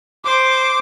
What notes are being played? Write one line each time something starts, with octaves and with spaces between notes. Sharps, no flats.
C5 D6